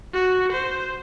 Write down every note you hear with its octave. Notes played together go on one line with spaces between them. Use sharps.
F#4
C5